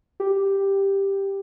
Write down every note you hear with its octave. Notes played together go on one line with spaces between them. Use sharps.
G4